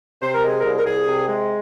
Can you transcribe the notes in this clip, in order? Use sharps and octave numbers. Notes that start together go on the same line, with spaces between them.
C3 C5
A#4
G#3 G#4
A#4
C2
A#4
C2 G#4
C3
G#3